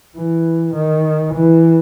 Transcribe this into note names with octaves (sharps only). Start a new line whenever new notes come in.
E3
D#3
E3